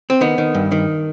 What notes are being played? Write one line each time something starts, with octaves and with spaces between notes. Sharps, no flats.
C4
D#3 B3
D#3
G2
D#3